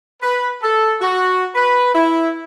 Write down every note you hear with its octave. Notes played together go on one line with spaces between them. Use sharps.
B4
A4
F#4
B4
E4